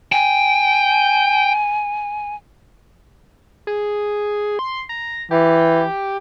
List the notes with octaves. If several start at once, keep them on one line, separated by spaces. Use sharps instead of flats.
G5 G#5
G#4
C6
A#5
E3 G4